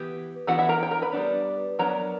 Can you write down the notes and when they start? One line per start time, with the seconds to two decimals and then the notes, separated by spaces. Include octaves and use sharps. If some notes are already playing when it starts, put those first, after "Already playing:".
Already playing: E3 B3 G4
0.47 E3 B3 D4 F#4 F#5
0.58 E4 E5
0.69 A#4 A#5
0.83 G5
0.91 A#4 A#5
1.02 B4 B5
1.13 G3 B3 D4
1.79 F#3 B3 D4 A#4 A#5